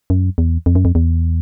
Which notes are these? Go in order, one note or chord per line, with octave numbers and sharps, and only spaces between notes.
F#2
E2
F2
F#2
F2
E2